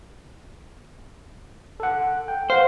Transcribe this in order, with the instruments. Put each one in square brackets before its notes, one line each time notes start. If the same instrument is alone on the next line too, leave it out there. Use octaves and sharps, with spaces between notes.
[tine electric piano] A4 F#5
G5
[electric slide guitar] C5 [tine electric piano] F5 F#5